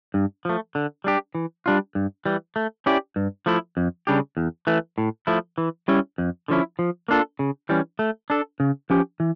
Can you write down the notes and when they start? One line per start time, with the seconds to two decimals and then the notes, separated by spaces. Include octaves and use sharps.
0.14 G2
0.45 F3 A3
0.75 D3
1.04 G3 D4 G4
1.35 E3
1.66 G3 D4 F4
1.95 G2
2.25 E3 G3
2.56 A3
2.86 C#4 E4 G4 D5
3.16 G2
3.46 F3 A3 E4
3.77 F2
4.07 C#3 G3 D4 G4
4.37 E2
4.67 E3 A3
4.98 A2
5.27 F3 A3 E4
5.58 E3
5.88 G3 C#4 E4
6.18 F2
6.48 D3 F3 C#4 E4
6.79 F3
7.08 A#3 D4 F4 A4
7.39 C#3
7.69 E3 G3 C#4
7.99 A3
8.30 D4 A4
8.60 C#3
8.90 F3 C#4 G4
9.20 E3